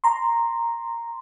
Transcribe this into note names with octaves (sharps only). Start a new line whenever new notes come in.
A#5 C6